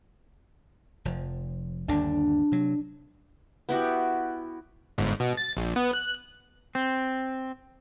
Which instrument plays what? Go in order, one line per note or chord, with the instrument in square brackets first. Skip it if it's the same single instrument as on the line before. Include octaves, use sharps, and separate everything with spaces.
[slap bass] F1 F3
[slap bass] G1 D#2 D3 [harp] D4
[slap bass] C3 F#3
[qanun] B3 E4 F#4 G4
[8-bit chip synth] G1 G#2
B2
A6
A#1
B3
F#6
[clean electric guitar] C4